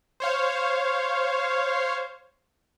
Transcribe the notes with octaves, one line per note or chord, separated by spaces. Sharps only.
C5 C#5 F5